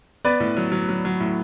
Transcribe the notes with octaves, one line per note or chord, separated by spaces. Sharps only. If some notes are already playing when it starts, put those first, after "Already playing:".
B3 B4 D5
A2
F#3
F#3
F#3
F#3
A2